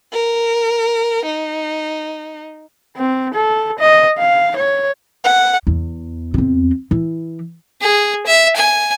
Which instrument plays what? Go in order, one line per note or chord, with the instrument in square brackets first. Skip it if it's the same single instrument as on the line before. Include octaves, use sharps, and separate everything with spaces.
[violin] A#4
D#4
[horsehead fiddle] C4
A4
D#5
F5
C#5
[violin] F#5
[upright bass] E2
E2 C4
E3
[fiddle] G#4
E5
G#5